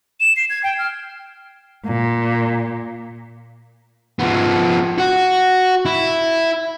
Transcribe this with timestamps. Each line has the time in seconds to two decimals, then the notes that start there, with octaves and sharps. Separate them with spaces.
0.20 E7
0.36 C7
0.50 G#6
0.63 G5
0.78 F6
1.86 A#2
4.19 F3 B3
4.98 F#4
5.85 E4